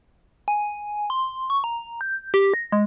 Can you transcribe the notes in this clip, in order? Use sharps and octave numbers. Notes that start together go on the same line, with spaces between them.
G#5
C6
C#6
A#5
G6
G4
A#6
G#3